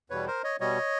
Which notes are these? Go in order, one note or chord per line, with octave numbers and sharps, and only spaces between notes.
E2 B2 G3 B4 C#5
A#4 C5
C#5 D#5
B2 G3 C#5 D#5